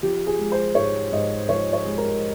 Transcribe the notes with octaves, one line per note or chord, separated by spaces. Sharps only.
F3 G4
G#4
G#3
C5
G#2 C#5
G#2 D#5
F3 C#5
C#5
G#3
A#4